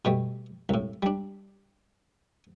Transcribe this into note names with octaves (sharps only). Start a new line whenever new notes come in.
B2 G3 A3
C2 A2
G3 D4